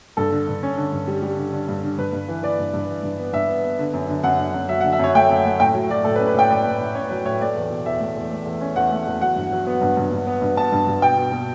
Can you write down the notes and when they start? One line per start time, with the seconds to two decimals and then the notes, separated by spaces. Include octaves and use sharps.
0.17 G2 A4
0.32 D3
0.47 G2
0.63 C#4
0.77 D3
0.92 G2
1.08 G3
1.22 G3
1.38 D3
1.53 D3
1.69 G2
1.84 D3
1.98 G2 B4
2.13 G2
2.28 E3
2.43 E3 D5
2.59 G2
2.74 G2
2.88 E3
3.03 G2
3.19 B3
3.33 G2 E5
3.48 B3
3.64 B3
3.79 D3
3.93 F#2
4.09 D3
4.23 F#2 F#5
4.39 D3
4.54 F#2
4.69 F#3 E5
4.81 F#5
4.84 D3
4.93 E5
4.99 F#2 C#5
5.15 A3 G5
5.30 F#2
5.45 A3
5.60 A2 G5
5.75 F#3
5.90 F#3 D5
6.04 A2 A4
6.16 B4
6.20 C#4
6.27 B4
6.35 A2 G5
6.50 A2 D5
6.66 A2
6.80 A2
6.95 C#4 C#5
7.10 F#3 B4
7.26 A2 C#5
7.41 A3 D5
7.56 E2
7.70 B2
7.86 E2 E5
8.00 A3
8.16 E2
8.31 A3
8.45 E2
8.61 C#4
8.76 E2 F#5
8.92 A3
9.07 E2
9.21 F#3 F#5
9.36 G2
9.52 F#3
9.67 B3
9.82 G2
9.97 G2
10.12 G2
10.27 B3
10.42 G2
10.56 B3 A5
10.72 G2
10.87 G2
11.02 B2 G5
11.17 B2
11.32 B2